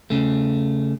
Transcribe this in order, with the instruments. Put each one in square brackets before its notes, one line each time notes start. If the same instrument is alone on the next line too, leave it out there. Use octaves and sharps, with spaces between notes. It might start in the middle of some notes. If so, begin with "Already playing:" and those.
[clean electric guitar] C#3 A3